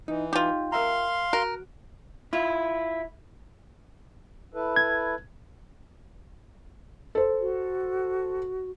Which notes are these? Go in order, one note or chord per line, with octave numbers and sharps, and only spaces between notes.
E3 D#4
D#4 F4 G4
A#4 E5 F5 A#5 C6
F#4 A#4
E4 F4
E4 A4 B4
G#6
A4 C5
F#4